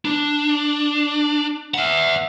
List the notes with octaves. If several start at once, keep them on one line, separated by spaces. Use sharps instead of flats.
D4
E5 F#5